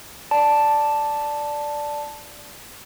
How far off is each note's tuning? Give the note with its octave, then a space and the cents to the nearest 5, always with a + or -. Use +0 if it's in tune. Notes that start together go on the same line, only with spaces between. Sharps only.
D5 +0 A5 +0